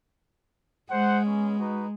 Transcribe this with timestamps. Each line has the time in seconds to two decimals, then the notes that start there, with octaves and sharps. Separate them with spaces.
0.91 G#3 C5 F#5
1.25 B3 C#4
1.58 D#4 F#4 B4